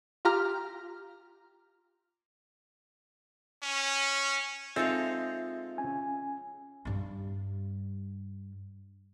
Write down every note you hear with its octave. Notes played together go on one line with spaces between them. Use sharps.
F4 G4 A#5 F6
C#4
G#3 C4 D#4 F4 A4 E5 F5
C#4 G#5
G2 G3